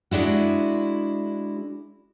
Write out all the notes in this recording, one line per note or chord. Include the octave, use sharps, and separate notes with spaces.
G#3 D4 E4 F#4